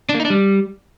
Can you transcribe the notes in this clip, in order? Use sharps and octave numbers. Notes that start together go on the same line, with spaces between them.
D4
A#3
D#4
D4
G3